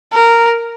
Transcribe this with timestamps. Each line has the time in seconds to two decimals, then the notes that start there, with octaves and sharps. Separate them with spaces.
0.13 A#4